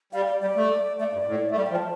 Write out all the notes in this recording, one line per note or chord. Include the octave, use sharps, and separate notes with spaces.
G3 F5
D5
G3 D5
A3
A3 D5
G2
A2
A3
G3 D5
G5
F3
A5